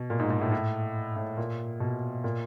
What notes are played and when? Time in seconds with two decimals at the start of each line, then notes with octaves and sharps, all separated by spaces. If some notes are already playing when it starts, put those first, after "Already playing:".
Already playing: B2
0.10 A#2
0.20 G#2
0.30 G#2
0.41 A2
0.52 A2
1.16 A2
1.37 A#2
1.80 B2
2.24 A#2